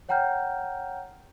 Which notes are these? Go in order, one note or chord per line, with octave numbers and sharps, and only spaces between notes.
C#5 F#5 G5 A#5 F6 G6